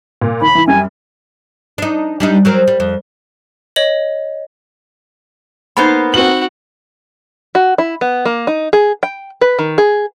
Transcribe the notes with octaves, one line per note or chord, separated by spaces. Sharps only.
A#2
D#2 B5
E3
F#2 G3 G#5
D4 D#4
G3 D4 D#4
F#3 C4 A#4
G3
F2
C#5 D#5 F#7
A#3 B3 D#4 C5 B5
C4 F#4 F#7
F#4
E4
B3
A#3
D#4
G#4
G5
B4
D#3
G#4